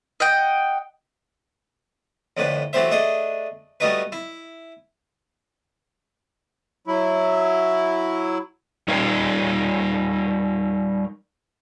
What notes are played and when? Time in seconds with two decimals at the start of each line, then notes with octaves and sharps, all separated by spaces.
0.20 D#5 F#5 G5
2.37 F2 A2 D3 B4
2.73 E3 F#3 A3 G4 C5 E5
2.91 A3 D4 G#4 D#5 F#5
3.80 G3 A3 B3 D#4 F#4 B4
4.12 E4
6.87 F#3 E4
8.88 G3 D#4 A#4 F5